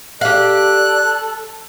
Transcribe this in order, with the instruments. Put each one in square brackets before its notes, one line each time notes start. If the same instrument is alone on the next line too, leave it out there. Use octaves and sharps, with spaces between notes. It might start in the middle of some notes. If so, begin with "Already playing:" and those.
[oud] G4 F5 [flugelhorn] A4 [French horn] D5 [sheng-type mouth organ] F#6